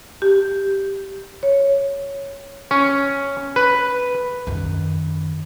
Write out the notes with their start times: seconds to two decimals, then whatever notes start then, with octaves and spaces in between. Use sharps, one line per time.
0.22 G4
1.43 C#5
2.71 C#4
3.56 B4
4.47 F#2 D#3